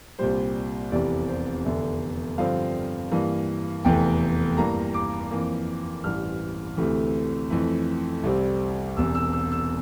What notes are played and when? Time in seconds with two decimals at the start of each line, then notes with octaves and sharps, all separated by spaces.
0.19 C2 A#2 G3 C5
0.92 F1 E2 C3 E3 G3 D5
1.29 C5
1.65 F1 E2 D3 E5
2.38 G2 D3 F3 C4 F5
3.11 G2 E3 A#3
3.84 F1 E2 E3 A3 G5
4.57 G2 E3 A#3 A#5
4.94 D6
5.31 F2 E3 A#3
6.04 A1 G2 E3 F6
6.77 D2 C3 E3 A3
7.50 F2 E3 A3
8.23 C2 C3 G3 C4
8.97 E1 E2 C3 E6
9.15 E6
9.33 E6
9.52 E6